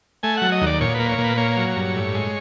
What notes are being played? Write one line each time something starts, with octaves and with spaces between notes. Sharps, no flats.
A3 G#5
F#3 F#5
D#5
D#2
D5
A#2 C#5
B4
A#3
C#5
A#2
B4
A#3 C#5
F#3
G2
A2
G#3